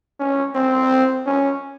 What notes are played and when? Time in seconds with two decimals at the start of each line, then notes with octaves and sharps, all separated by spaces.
0.20 C#4
0.55 C4
1.26 C#4